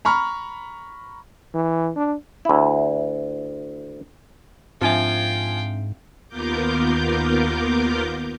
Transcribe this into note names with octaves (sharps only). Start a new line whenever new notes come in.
A#5 B5 C#6 F6
E3
D4
D2 E4
G#2 F3 C4 D4 E5 F5 G5 G#5
D#2 B3 F4 A#4 D6 G6